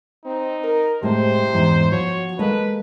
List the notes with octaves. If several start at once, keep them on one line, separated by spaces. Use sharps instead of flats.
C4 D#4
A#4
A2 C3 G#3 C5
E2 G#2 E3
F3 F#4 C#5
G#3 A#3 A4 B4 D#5